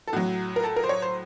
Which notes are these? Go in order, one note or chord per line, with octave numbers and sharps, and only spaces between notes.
A4
A2 F#3 F#4
A#4
A4
A#4
C5
C#5
C5